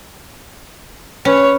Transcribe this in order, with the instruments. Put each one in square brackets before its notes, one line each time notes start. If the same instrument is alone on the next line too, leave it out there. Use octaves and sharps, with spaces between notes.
[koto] C#4 [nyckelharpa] B4 C#5